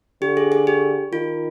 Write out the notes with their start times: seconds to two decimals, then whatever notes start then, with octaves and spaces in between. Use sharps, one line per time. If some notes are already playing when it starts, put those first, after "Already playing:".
0.21 D3 G4
0.37 G#4
0.52 G#4
0.67 G4
1.13 D#3 F4